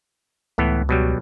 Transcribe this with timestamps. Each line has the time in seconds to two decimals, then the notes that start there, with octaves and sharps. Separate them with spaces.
0.58 C#2 A2 E3 B3
0.89 B2 F#3 G3